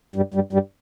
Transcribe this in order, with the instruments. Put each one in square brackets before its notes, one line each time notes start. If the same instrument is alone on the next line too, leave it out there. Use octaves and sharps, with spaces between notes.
[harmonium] G2 G3
G2 G3
G2 G3